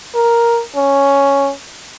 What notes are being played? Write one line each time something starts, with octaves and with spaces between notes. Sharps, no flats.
A#4
C#4